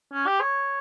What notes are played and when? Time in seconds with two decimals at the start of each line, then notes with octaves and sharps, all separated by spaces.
0.13 C#4
0.27 G4
0.41 C#5